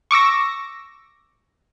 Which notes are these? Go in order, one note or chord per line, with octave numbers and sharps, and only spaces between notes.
C#6 D6 E6 A#6